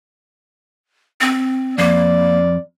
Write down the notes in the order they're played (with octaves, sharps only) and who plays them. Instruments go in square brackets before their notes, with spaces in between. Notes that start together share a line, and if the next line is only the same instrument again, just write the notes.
[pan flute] C4
[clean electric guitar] F2 [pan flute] A#3 [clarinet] D5